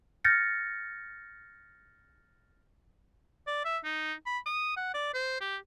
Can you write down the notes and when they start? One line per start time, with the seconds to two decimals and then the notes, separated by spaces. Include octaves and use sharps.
0.24 F6 G6 A6 A#6 C#7
3.47 D5
3.65 E5
3.85 D#4
4.26 B5
4.46 D#6
4.76 F#5
4.94 D5
5.14 C5
5.41 G4